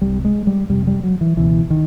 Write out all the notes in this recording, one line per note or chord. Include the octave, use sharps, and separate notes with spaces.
C2 C3 G3
G#3
G3
F2 C3 G3
G3
F#3
E3
C#2 B2 E3
D#3